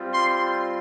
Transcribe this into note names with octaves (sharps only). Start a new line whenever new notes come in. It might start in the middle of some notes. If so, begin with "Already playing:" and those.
Already playing: G3 C4 F4
C6